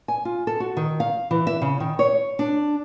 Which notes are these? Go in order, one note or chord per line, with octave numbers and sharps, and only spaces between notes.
G#5
F4
A4
F#4
D#3
F5
E3
E5
C#3
D#3
C#5
D4